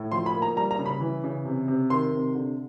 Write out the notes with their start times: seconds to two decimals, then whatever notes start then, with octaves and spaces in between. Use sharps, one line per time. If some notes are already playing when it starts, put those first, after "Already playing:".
Already playing: A2
0.11 F3 C6
0.26 B5
0.34 A#3
0.42 A#5
0.56 G3 A#5
0.71 A#5
0.79 C#3
0.86 B5
1.00 E3
1.24 C#3
1.45 C3
1.68 C3
1.90 D#3 C6
2.12 C3
2.35 D3